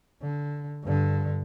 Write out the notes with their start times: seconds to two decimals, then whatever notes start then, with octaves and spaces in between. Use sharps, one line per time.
0.21 D3
0.83 G2 D3